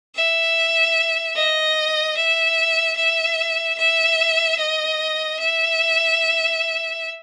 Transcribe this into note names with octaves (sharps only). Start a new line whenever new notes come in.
E5
D#5
E5
E5
E5
D#5
E5